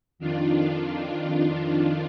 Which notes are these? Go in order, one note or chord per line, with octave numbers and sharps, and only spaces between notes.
F2 D#3 D4 F4